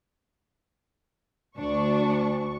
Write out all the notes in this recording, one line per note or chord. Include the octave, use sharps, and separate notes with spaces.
D2 D4 C#6